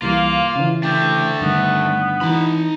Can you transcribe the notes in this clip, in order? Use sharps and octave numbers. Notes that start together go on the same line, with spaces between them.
C2 E3 G3 A#3 F4
C#3 E3
A3 D4 G4
G2 D3 D#3 B3
E3 D#4 B5